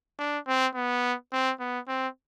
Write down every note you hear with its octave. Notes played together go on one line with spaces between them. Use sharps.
D4
C4
B3
C4
B3
C4